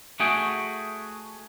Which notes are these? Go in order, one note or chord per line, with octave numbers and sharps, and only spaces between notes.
A3 F#4 G#4 G5